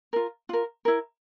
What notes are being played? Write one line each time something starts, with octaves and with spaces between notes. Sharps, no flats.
F4 A#4
F4 A#4
E4 A#4